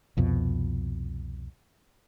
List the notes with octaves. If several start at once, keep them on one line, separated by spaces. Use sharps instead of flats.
C2 F2 B2